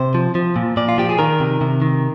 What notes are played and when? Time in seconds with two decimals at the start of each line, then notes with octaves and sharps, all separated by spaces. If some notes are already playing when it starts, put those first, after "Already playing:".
Already playing: C3 C5
0.15 F3
0.35 F3
0.56 A#2
0.77 A#2 D5
0.89 F4
0.98 F3 G4
1.09 G#4
1.19 D#3 A#4
1.40 C3
1.61 C3
1.82 D#3